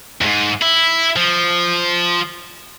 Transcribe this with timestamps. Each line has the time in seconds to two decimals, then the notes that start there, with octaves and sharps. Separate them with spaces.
0.21 E2 G#2
0.62 E4
1.16 F3